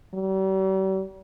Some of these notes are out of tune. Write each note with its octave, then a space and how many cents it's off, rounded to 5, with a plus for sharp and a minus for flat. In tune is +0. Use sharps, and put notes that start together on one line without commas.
G3 -45